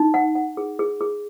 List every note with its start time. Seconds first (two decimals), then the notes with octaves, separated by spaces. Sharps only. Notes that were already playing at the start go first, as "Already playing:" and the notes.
Already playing: D#4
0.14 F#5
0.35 F#5
0.57 G#4
0.79 G#4
1.01 G#4